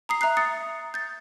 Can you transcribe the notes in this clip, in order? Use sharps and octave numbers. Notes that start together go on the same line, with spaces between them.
A#5 D#6 C7
E5 A#5 D#6 F#6 C7
D#6 A6 C#7
G6 A6